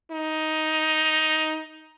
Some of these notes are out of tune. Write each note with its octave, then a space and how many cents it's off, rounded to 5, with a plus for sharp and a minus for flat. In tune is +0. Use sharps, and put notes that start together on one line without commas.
D#4 +10